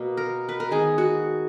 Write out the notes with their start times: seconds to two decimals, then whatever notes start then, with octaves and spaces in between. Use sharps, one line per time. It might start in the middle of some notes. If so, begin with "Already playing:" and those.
Already playing: B2 A#3
0.17 A#4
0.49 B4
0.60 A#4
0.70 D#3 G#3 B3 G#4
0.98 F#4